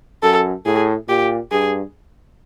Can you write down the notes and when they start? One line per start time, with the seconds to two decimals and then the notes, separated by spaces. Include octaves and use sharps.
0.23 F#2 A4
0.65 A2 G#4
1.08 A#2 G4
1.51 G2 G#4